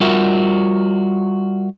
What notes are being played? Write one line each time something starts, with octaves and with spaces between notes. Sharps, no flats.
G3 F4 F#4 A#4 E5